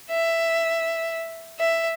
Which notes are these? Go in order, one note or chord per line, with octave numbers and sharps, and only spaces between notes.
E5
E5